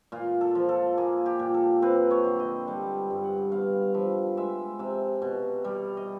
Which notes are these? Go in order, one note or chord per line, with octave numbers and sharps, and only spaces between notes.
A#2 F4
A4
F3
A4
A#3 G#4
G4
A#2
A4
C4 B4
C#5
D3
D#5
G3 A5
G2
F#5
B3 F5
F3 E5
G#3 E5
C3 E5
B2
G3
D#5